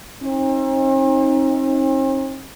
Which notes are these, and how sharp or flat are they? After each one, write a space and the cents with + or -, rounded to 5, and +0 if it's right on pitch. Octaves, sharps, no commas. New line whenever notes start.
C4 +45 D#4 +15